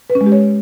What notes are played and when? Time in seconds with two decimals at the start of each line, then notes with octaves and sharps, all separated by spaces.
0.10 B4
0.15 C#4
0.21 G#3
0.26 G4
0.32 C#5